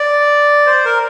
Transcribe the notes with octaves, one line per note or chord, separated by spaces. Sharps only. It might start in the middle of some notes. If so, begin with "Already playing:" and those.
Already playing: D5
C5
A#4